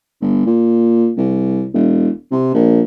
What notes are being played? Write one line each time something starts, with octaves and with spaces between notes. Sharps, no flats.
G1
A#2
C2
E1
C3
A#1